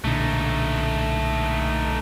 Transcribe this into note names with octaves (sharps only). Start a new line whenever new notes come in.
B1 A#2 D3 A3 D#4